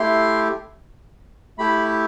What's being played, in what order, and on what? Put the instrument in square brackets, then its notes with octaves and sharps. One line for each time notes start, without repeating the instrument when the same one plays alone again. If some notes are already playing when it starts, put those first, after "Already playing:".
Already playing: [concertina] A3 E4 G4 C6
A3 E4 G4 B5